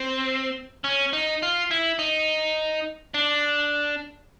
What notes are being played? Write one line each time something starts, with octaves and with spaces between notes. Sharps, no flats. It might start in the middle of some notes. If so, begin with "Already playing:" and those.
Already playing: C4
C#4
D#4
F4
E4
D#4
D4